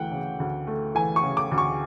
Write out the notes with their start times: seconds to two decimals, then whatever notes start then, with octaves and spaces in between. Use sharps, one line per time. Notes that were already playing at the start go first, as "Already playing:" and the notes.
Already playing: D2 E3 A3 F#5 G5
0.12 C#3
0.40 D2
0.67 A3
0.95 E3 G#5
1.16 C#6
1.23 C#3
1.37 D6
1.51 D2
1.58 C#6